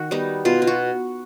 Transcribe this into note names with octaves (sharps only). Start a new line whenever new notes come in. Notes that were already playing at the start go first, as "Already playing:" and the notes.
Already playing: D#3 F#4
G3 B3 D#4
B2 F4
F4
F#4